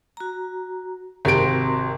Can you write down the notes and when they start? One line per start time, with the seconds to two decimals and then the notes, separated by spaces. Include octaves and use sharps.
0.17 F#4 A#5
1.25 G#1 C3 C4 F#4 A#4 D7